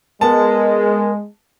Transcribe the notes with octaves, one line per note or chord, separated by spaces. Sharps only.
G#3 B3 A#4 A5